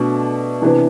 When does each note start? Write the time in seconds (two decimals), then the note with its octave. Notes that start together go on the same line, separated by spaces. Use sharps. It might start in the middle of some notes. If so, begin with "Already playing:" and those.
Already playing: B2 A3 D4
0.62 C3 E3 B3 D4